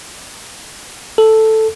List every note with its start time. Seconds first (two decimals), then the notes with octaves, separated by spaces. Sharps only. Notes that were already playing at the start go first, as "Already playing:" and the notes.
1.18 A4